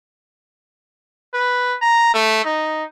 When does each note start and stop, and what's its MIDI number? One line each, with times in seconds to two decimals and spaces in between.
1.34 1.76 71
1.82 2.12 82
2.14 2.44 57
2.45 2.84 63